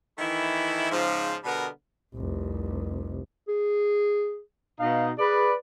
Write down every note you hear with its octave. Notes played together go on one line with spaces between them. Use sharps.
D#3 E3 A3 E4
G#2 C#3 F3
B2 D3 G3 B3 A#4
F1 C2
G#4
B2 D#4 F5
G#4 B4 D5